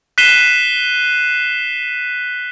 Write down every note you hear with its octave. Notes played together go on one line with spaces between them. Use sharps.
F#6 B6 C7 D#7 E7 G7